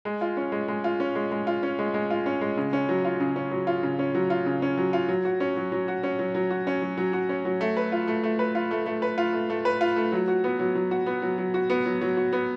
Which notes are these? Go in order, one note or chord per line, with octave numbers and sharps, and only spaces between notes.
G#3
F4
C#4
G#3
G#3
F4
C#4
G#3
G#3
F4
C#4
G#3
G#3
F4
C#4
G#3
C#3
C#4
F#3
F4
C#3
C#4
F#3
F4
C#3
C#4
F#3
F4
C#3
C#4
F#3
F4
F#3
F#4
C#4
F#3
F#3
F#4
C#4
F#3
F#3
F#4
C#4
F#3
F#3
F#4
C#4
F#3
A3
B4
F4
A3
A3
B4
F4
A3
A3
B4
F4
A3
A3
B4
F4
A3
F#3
F#4
B3
F#3
F#3
F#4
B3
F#3
F#3
F#4
B3
F#3
F#3
F#4
B3